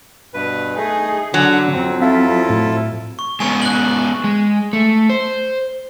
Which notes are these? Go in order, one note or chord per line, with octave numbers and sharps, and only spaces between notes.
G2 B2 B4
A3 D#4 G#4
D3 F#3 F#5 C#6
F2 C4
C4 E4 F4 A4 F5 B6
A2
C#6
G#3 B3 C#4 G#5 C#6
F#6 F#7
G#3
A3
C5